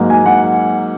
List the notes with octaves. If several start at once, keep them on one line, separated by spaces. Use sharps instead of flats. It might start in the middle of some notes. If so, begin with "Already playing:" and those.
Already playing: G#2 F#3 A#3
G#5
F#5